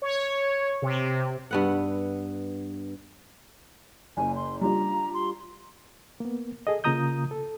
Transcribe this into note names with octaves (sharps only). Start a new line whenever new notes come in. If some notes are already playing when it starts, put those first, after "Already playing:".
C#5
C3
G2 B3 F#5
F#1 G#5
C6
G3 D4 F4 A#5
C6
A#3 B3
G#4 A4 D#5
C#3 A#3 F4 A#5 D#6 G6
A4